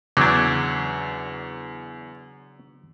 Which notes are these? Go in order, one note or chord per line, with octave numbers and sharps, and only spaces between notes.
E2 C#3 F#3 D4 D6 G6 G#6